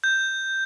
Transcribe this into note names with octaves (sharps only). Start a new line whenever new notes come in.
G6